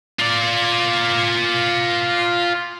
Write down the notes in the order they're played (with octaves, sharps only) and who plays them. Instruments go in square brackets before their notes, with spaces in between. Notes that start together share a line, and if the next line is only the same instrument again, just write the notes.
[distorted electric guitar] F4 D5